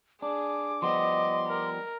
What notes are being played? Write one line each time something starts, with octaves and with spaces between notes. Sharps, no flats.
D4 G#4 D6
F3 G3 B3 D#5 C6
A#4